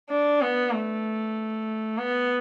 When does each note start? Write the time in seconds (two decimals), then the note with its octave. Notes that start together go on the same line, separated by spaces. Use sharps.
0.10 D4
0.41 B3
0.73 A3
1.98 B3